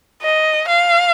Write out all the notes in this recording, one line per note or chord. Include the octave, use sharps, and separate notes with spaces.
D#5
F5